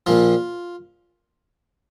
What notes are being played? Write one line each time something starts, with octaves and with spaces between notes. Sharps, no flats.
A#1 A#2 F3 F4